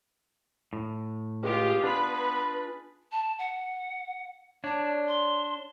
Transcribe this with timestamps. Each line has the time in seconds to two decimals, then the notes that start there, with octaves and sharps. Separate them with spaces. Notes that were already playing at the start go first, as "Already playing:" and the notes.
0.73 A2
1.43 C#2 F4 G4 G#4
1.84 B3 D4 F4 G#4 B4 B5
3.11 A5
3.38 F#5
4.64 D4 C#5 D5 A5
5.07 C6